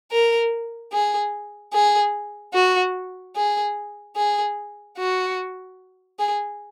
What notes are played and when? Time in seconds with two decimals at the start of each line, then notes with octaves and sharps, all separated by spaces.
0.11 A#4
0.93 G#4
1.74 G#4
2.54 F#4
3.36 G#4
4.16 G#4
4.98 F#4
6.19 G#4